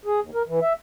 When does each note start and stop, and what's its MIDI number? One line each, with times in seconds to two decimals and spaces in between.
0.05 0.20 68
0.21 0.30 39
0.34 0.43 70
0.48 0.60 52
0.62 0.73 76